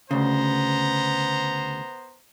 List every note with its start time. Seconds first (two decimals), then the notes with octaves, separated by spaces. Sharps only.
0.11 D2 C#3 B3 C5 A#5